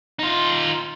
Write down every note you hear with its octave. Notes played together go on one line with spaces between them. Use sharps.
D#4 F4